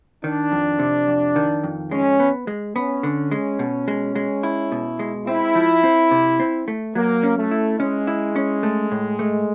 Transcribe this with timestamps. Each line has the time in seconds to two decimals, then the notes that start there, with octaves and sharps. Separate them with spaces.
0.24 D#3 D4
0.52 F2
0.79 C3
1.08 F2
1.36 D#3
1.64 F2
1.91 G#3 C#4
2.20 B3
2.47 G#3
2.75 B3 C#4
3.03 D3
3.31 G#3
3.59 B2
3.88 G#3
4.16 G#3
4.43 E4
4.72 B2
4.99 G#3
5.27 C4 E4
5.55 F3
5.83 C4
6.11 C3
6.40 C4
6.68 A3
6.95 F#3 A#3
7.23 C#4
7.38 A3
7.51 E4
7.79 G#3 C#4
8.07 E4
8.36 C#4
8.63 A3
8.91 A2
9.19 A3